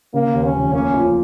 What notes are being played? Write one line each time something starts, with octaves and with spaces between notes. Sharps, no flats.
C#3 A#3
D#2
C#4
F1
A#3 C#4
F3